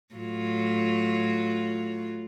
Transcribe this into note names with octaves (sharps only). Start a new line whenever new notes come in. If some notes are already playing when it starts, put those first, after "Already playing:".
A2 F#3 F4